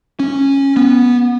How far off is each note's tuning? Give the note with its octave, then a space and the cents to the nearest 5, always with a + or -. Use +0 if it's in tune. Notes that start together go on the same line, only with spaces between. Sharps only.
C#4 -10
B3 -10